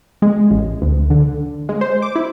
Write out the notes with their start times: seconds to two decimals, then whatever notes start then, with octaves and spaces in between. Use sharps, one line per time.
0.22 G#3
0.51 A1
0.82 D2
1.10 D3
1.69 G#3
1.81 C5
2.02 D6
2.16 E4